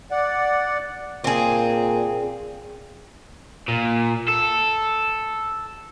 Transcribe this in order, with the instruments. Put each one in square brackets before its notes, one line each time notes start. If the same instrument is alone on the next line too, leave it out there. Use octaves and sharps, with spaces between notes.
[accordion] D5 F#5
[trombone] A#2 [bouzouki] C4 G#4
[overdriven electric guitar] A#2
A4